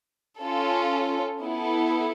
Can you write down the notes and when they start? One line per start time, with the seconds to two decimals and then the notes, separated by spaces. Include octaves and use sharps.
0.38 C#4 F4 A4
1.41 B3 E4 A4